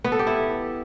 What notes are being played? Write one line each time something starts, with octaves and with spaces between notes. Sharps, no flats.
B3
A4
G4
E4